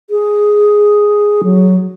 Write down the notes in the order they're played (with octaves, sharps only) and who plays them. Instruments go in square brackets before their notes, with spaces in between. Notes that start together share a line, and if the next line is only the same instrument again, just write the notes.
[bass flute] G#4
F#3